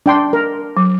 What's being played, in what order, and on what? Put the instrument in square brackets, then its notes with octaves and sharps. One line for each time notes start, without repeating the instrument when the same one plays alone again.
[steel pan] D4 G5 C6
A#4
[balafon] F#3